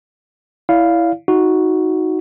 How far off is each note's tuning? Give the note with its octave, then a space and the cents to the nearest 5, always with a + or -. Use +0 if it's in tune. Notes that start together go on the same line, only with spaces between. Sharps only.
E4 +0 D5 -40 F5 +0
D#4 +20 F#4 +0